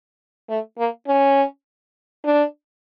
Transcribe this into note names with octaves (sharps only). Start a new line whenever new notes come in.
A3
A#3
C#4
D4